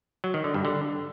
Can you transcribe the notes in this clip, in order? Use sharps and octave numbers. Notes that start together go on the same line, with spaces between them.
F#3
D#3
D3
G2
D3